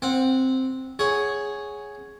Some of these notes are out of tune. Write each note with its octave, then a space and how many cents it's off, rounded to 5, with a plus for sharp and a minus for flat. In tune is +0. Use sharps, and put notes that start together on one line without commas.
C4 +0 F#5 -15
G#4 +0 C#5 +0 F#5 +15